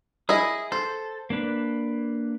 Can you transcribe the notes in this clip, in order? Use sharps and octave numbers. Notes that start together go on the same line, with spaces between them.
E4 G#4 D#5 D#6
A4 C5
A#3 D4 B4